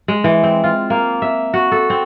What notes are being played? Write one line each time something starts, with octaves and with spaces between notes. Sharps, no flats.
G#3
E3
C4
F4
A#3
E5
F#4
A4
C4